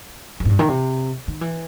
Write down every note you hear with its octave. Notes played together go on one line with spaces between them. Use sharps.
F#2
A2
G2
D#3
C3
D#3
E3